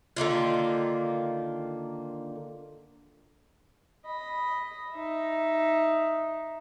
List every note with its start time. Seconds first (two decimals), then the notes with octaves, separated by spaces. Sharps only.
0.16 D3 D#3 A#3 F4
4.05 D#5 B5
4.93 D#4 E5